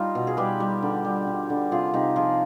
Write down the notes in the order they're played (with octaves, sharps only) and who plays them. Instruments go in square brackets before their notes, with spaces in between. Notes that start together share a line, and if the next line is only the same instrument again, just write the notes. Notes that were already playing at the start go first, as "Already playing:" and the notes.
Already playing: [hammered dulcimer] G3 D#4 F4
B2
G#4
G3 G4 B4
G3
D3
G3
D3
D3
C3 F4 G#4
C3 D#4 G4
F3 F4 G#4